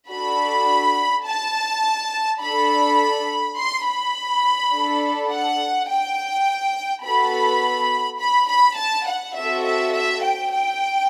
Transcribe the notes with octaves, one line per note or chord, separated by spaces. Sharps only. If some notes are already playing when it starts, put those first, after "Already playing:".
D4 F#4 A4 B5
A5
D4 A4 B5
C6
B5
D4 A4
F#5
G5
B3 F#4 A4 B5
B5
B5
A5
F#5
C4 F#4 A4 E5
E5
E5
G5
G5